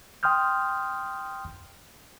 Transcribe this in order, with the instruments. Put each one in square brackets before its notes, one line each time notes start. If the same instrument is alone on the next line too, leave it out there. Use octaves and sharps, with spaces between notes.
[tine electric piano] G5 C6 D#6 F6 G6